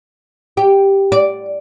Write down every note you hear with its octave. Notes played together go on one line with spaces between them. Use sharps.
G4
D5